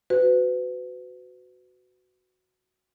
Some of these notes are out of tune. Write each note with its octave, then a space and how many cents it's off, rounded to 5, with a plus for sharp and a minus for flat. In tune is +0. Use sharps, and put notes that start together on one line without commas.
F#4 +0 B4 +30